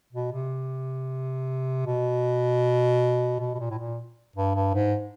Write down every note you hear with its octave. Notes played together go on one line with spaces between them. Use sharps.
B2
C3
B2
B2
B2
A#2
A2
A#2
G2
G2
G#2